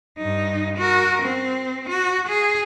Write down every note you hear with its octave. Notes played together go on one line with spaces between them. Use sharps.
G2 D#4
F#4 A#4
C4
F#4
G#4